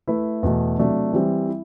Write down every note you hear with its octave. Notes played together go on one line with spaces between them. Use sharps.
A3 E4 B4 E5
E2 B2 A3
C3 F#3 A3 D4
E3 G3 C4
E4